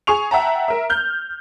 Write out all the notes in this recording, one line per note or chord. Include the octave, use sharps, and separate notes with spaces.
G#4 C#6 F7
E5 F#5 G5 A5 A#5
A#4 E5
F6 G6